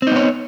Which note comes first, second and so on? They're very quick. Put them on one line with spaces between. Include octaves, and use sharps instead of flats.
C4 D#4 B3 C#5